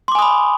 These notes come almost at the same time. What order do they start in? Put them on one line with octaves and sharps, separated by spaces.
C6 D6 G#5 D#6 B5